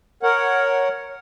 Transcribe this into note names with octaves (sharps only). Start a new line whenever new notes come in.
A#4 C#5 F#5